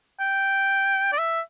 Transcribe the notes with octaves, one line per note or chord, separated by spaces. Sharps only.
G5
D5
E5